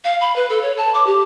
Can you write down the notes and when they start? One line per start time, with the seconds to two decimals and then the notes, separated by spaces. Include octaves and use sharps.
0.04 F5
0.21 B5
0.36 B4
0.50 A4
0.62 C#5
0.77 A5
0.94 D6
1.06 G4